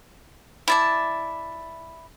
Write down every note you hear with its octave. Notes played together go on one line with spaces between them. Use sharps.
E4 D5 A5